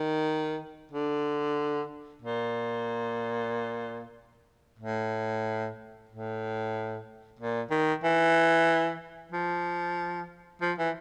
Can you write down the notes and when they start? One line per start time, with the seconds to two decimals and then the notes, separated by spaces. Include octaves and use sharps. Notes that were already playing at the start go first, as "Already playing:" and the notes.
Already playing: D#3
0.92 D3
2.22 A#2
4.79 A2
6.09 A2
7.39 A#2
7.71 D#3
8.03 E3
9.32 F3
10.61 F3
10.79 E3